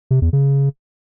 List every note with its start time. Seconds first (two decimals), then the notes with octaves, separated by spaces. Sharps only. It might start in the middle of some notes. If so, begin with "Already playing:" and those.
0.11 C3
0.22 E2
0.33 C#3